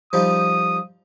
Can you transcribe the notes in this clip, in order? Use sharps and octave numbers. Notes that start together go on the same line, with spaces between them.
F3 G3 D#4 D#6